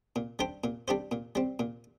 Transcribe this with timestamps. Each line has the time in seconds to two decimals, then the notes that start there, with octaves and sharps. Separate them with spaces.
0.16 A#2
0.39 G3 D4 G4 C5
0.64 A#2
0.88 G3 D4 G4 C5
1.12 A#2
1.35 G3 C4
1.59 A#2